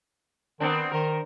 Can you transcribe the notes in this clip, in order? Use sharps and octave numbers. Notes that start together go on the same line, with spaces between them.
D#3 B3 C4 D4
D#3 A#4